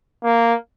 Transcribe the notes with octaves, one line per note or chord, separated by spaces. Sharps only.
A#3